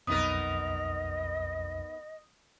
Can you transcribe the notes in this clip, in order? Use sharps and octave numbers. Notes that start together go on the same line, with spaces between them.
B1 F2 B3 D#4 A#4 D#5 D#6